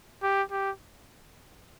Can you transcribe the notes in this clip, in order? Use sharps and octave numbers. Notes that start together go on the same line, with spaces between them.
G4
G4